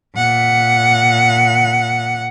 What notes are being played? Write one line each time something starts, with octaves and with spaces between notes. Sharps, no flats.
A#2 F#5